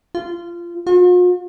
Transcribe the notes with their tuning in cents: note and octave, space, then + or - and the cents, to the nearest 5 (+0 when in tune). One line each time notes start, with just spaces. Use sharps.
F4 -20
F4 +45